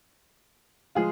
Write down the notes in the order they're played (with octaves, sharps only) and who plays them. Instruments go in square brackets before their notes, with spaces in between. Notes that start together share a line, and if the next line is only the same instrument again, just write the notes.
[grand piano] F3 G#3 F4 G#4